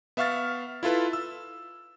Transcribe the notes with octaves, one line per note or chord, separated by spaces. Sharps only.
B3 E5 F5 C#6 F6 A6
E4 F4 A4 B4
E6